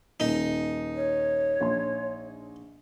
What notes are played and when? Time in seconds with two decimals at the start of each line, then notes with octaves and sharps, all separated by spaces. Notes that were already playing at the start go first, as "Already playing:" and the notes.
0.20 D#1 D#4
0.95 C#5
1.61 A#1 C6